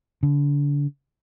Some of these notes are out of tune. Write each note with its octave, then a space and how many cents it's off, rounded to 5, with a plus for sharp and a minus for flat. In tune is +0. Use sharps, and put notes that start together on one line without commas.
D3 -35